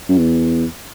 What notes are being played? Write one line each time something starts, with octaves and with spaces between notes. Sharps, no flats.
F#2
E2